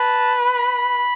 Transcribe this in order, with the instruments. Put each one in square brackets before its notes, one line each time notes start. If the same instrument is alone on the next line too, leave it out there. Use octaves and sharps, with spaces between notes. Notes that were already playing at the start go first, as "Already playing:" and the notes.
Already playing: [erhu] B4 [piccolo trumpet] A5
[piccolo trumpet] B5